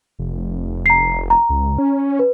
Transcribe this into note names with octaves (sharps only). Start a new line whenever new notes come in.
F1
A#5 C7
A#5
C#2
C#4
B4